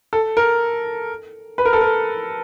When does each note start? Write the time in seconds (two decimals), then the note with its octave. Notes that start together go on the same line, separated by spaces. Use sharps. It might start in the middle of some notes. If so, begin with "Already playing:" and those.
0.13 A4
0.37 A#4
1.58 B4
1.65 A#4
1.73 A4
1.81 A#4